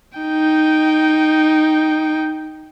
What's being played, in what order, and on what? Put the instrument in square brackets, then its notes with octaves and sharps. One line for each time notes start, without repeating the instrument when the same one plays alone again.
[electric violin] D#4 G5